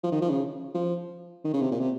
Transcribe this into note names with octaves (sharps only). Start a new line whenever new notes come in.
F3
D#3
F3
C#3
F3
D#3
C#3
C3
A#2
C3